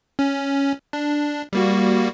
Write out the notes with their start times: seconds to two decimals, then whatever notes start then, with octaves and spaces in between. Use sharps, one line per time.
0.19 C#4
0.93 D4
1.53 G3 A#3 F#4